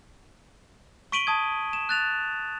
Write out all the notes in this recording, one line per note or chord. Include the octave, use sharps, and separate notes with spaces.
C#6 B6 D7 D#7 F#7 G7
A5 D#6 G#6
E7
F#6 A6 F7